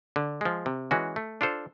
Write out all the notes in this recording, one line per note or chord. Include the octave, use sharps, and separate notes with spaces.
D3
F3 G#3
C3
E3 G#3 C#4 F#4
A3
D4 F4 A4 C5